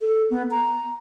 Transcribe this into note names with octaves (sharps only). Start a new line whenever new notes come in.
A4
B3
A#5